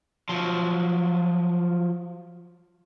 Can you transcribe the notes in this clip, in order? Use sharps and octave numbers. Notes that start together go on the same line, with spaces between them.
F3 F#3